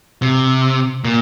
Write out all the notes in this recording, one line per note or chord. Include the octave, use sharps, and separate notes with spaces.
C3
A#2